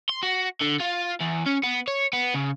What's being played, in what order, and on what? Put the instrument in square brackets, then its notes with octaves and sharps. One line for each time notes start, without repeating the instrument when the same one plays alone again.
[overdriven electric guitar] C6
F#4
D3
F4
E2
C#4
B3
C#5
B3
C#3